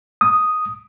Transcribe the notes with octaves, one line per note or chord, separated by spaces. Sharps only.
D#6